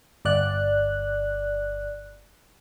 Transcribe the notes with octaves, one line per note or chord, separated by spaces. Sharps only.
G1 D5 F#6